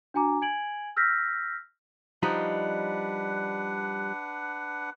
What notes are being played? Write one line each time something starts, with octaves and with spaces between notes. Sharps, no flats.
D4 F#4 G#5 A#5 D6
G#5 G#6 D7 F#7
E6 F6 G6 A#6 B6
F3 G3 D4 D#4 B4 F#5